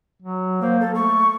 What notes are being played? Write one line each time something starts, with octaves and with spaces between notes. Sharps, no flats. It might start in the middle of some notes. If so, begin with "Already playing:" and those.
F#3
A#3 C5
A4
A3 C#6